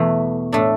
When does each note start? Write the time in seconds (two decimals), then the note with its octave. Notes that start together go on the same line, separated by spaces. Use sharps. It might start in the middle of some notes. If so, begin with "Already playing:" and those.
Already playing: E2 B2 A3
0.52 A2 A3 D4 A4